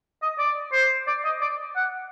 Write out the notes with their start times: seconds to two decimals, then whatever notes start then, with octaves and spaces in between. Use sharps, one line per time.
0.23 D#5
0.39 D5
0.73 C5
1.08 D5
1.25 D#5
1.42 D5
1.76 F#5